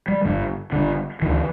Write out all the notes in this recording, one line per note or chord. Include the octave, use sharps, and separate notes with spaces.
G3
G1 G2 D3
G1 G2 D3
D2 D3 E3